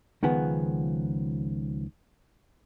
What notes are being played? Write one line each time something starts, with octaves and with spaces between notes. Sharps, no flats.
C#2 D#3 F3 B3 G#4 F#5